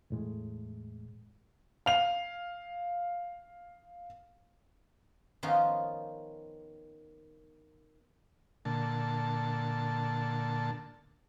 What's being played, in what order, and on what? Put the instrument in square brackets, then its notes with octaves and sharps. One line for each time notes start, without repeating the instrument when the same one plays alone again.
[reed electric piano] E2 A2 G#3
[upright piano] F5 F7
[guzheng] D#3 F3 B3 C#4 D#4 F4
[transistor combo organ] A#2 D3 A5